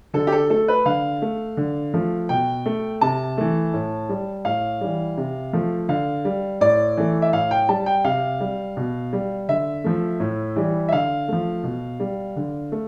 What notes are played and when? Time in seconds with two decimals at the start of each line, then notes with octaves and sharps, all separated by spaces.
0.14 D3 A4
0.27 G4
0.32 A4
0.50 A3 A4
0.68 B4
0.86 D3 F5
1.22 A3
1.57 D3
1.94 F3 A3
2.29 B2 G5
2.66 A3
3.01 C3 A5
3.38 E3 A3
3.74 A2
4.09 G3
4.45 A2 F5
4.81 E3 G3
5.18 C3
5.53 F3 A3
5.89 D3 F5
6.25 G3
6.61 A2 D5
6.97 E3 A3
7.22 E5
7.33 A2 F5
7.51 G5
7.69 G3 A5
7.86 G5
8.05 C3 F5
8.40 G3
8.77 B2
9.13 G3
9.49 D3 E5
9.84 F3 A3
10.20 A2
10.56 E3 G3
10.89 E5
10.92 D3 F5
11.28 F3 A3
11.64 B2
12.00 G3
12.36 D3
12.72 A3